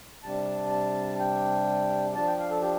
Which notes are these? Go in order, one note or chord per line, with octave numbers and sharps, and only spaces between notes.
C3 G3 D4 A5
A5
G5
F3 D4 A5
G5
F5
A4
G4